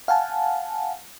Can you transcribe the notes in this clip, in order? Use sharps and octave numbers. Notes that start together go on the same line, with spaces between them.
F5 F#5 G#5 A5